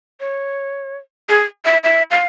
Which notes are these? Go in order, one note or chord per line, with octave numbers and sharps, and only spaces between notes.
C#5
G#4
E5
E5
F5